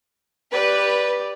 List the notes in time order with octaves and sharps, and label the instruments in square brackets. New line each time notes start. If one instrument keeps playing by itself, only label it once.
[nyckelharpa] G4 D5 [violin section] B4